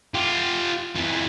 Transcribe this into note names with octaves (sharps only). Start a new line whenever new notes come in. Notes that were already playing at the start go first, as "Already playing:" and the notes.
F4 G4
F2 E3